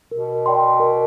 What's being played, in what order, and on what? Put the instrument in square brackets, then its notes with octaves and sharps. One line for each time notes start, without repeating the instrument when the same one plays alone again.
[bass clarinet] B2 [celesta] A#4
[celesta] D5 G5 C6
A#4